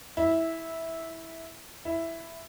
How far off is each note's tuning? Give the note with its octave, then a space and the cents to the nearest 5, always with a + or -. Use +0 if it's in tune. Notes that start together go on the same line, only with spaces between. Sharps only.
E4 -15
E4 +0